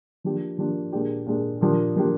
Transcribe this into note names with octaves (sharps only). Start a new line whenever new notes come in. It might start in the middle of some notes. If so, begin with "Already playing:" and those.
F3 A#3 D4 G4
F3 A#3 D4 G4
A#2 G#3 D4 G4
A#2 G#3 D4 G4
A#2 F3 A#3 D4 G4
A#2 F3 A#3 D4 G4